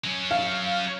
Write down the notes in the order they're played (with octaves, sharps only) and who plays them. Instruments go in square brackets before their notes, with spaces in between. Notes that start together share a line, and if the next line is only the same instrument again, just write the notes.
[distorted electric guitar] F#3 C#4
[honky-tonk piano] F5